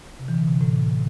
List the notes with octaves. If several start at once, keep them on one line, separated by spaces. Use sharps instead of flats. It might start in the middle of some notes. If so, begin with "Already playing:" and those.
C3
E3
D3
C3
A2